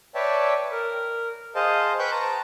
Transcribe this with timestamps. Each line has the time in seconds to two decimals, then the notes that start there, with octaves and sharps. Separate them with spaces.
0.15 B4 C#5 D5 E5 G5 A5
0.72 A#4
1.55 G#4 C5 D#5 F5 A5
1.99 B4 C5 G5 C#6 F#6 G6
2.11 A5 A#5